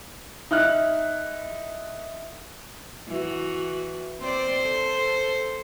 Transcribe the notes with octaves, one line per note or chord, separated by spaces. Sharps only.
D#4 E4 F6 F#6
E3 F#4
C4 C5 D5
A4